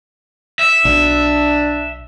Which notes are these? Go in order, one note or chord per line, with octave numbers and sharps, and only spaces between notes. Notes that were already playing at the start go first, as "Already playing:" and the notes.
E5
B1 D4